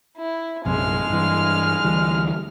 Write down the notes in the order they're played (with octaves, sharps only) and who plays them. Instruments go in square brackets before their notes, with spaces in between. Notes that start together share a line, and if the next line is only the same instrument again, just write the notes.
[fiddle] E4
[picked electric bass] A#1 F#2 C3 [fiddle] G#3 F6
[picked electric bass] G2 E3
D2 E3 G3